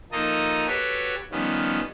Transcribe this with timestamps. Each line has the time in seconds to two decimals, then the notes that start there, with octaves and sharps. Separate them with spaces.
0.12 F3 A#3 D#4 A4 D#5
0.67 F#4 G4 A4 B4 C#5
1.31 D#3 F3 G3 B3 C#4